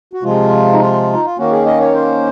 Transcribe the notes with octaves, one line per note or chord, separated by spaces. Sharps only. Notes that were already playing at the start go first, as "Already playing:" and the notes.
F#4
C3 F3 G#3 F4
D#4
F4
D#4
F4
D#3 A#3 C#4 F#4
G#4
D#5
C#5
C5